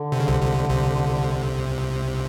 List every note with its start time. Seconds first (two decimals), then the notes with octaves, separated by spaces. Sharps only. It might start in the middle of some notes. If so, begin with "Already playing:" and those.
Already playing: D3
0.12 C3
0.20 C#3
0.28 C2 C3
0.41 C2 C3
0.70 C2 C3